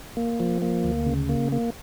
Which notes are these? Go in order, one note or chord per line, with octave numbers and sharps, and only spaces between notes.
A#3
F3
A#3
D2
C#3
A#3
A#3